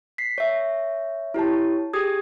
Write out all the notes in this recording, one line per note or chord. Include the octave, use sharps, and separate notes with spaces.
B6 C7
C#5 E5
E4 G4 C#5 A5
G4 G#4 D#6 G#6